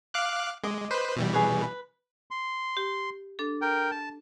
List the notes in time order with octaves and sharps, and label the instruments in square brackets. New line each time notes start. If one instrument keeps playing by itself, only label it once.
[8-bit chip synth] F5 D6 F#6
[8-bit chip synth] G#3 [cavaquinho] D#5 D6
[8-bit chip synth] B4 C5
B2 E3 G3
[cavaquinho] G#4 B4 C#5
B4
[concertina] C6
[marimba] G4
D4 A4
[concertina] A#4 G5
A5